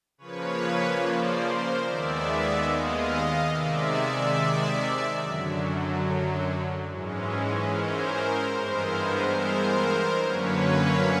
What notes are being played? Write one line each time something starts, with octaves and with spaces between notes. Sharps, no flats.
C#3 F3 A#3 B4 C#5
C5 D5
A#4 C5
D#2 D#3 G#3 B3 D5 E5
D#5 F5
C3 D#3 G#3 D5 E5
F#2 D3 F#3
G#2 E3 G#3 C#4
A#4 C5
G2 E3 G#3 B3 A#4 C5
A#4 C5
F#2 D3 F#3 A#3 C#4 B4 C#5